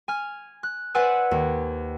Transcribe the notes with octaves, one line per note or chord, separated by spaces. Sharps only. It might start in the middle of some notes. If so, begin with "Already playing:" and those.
G#5 F6
F#6
B4 C5 D5 F#5 G#5 E6
D#2